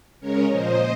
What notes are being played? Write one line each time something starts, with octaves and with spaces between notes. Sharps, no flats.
C#3 G#3 C#4 A#4 C#5
A#2 F3 A#3 C5 D#5